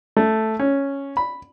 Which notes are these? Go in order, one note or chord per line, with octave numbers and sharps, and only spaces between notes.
A3
C#4
B5